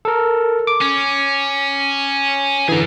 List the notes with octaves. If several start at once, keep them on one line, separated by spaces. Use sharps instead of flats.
A4 A#4
D6
C#4
D3 E3 G#4 A#5